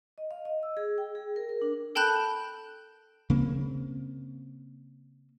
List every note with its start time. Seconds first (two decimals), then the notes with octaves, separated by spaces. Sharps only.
0.18 D#5
0.31 F5
0.45 D#5
0.63 E6
0.77 G#4
0.98 G5
1.15 G#4
1.36 A#4
1.49 A#4
1.62 D4
1.95 A4 G5 A5 B5 F#6 G6
3.30 C#3 A#3 C4